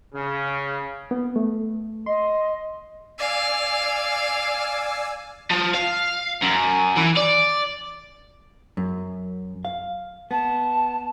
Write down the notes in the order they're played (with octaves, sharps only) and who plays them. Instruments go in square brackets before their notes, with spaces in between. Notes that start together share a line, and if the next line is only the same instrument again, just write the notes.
[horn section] C#3
[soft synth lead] B3
A3
[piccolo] D#5 [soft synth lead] C6
[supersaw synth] D5 G#5 E6 [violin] F5
[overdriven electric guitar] F3
F5
F#2
E3
D5
[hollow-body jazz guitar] F#2
F5
[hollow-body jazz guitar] B3 [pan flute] A5